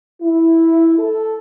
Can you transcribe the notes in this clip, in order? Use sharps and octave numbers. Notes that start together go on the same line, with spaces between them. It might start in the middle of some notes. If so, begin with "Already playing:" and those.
E4
A4